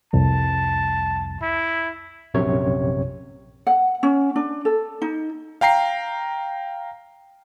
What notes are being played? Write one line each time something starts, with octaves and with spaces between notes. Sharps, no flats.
C2 F2 A5
E4
A#1 F#2 C3 C#5
F#5
C#4
D4
A4
D#4
F5 G5 A#5 C7